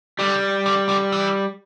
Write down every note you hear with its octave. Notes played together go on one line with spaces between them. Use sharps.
D3 G3
D3
D3
E3